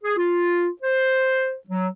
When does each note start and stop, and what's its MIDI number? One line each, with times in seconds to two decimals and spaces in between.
0.03 0.15 68
0.16 0.67 65
0.81 1.55 72
1.68 1.87 54